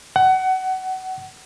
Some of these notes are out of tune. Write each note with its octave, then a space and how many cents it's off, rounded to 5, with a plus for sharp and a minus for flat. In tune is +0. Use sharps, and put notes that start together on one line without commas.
F#5 +25